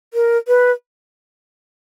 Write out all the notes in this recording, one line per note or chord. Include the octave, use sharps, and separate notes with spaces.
A#4
B4